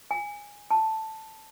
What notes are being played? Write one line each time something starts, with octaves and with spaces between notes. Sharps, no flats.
G#5
A5